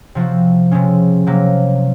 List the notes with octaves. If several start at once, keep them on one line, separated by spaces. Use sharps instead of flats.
C3 F3 C4 F#4
C3 F3 G#3 C#4
C3 F#3 A#3